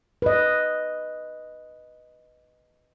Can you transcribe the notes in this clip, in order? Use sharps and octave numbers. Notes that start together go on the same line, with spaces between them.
B4 D#5